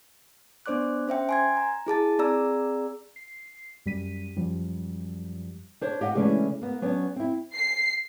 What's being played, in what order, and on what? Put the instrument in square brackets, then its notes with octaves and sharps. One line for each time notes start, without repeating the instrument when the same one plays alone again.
[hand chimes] B3 D4 C5 D5 D6 F#6
C#4 C5 E5 G5
G#5 C6 G#6
A#5
E4 G#4 A5 A6
C4 G#4 D5 A#5 E6
[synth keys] C7
F#2 G3 B6 D#7
F#2 F3 G3
[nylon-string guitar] D4 C5 C#5
G4 D#5 F#5
C#3 E3 G#3 A3 C#4 D4
A#3 B3
F#3 B3 C#4 D4
C4 E4
[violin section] C7